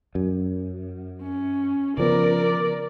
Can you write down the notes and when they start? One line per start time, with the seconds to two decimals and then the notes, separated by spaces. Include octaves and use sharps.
0.15 F#2
1.22 C#4
1.98 C#3 F3 B3 A#4 D5